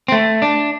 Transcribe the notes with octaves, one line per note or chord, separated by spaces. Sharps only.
C4
A3
D4